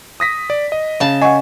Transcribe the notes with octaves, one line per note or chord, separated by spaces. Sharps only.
D#6 A#6 B6
D5
D#5
C#3 A5
D#5 F#5 G#5 C#6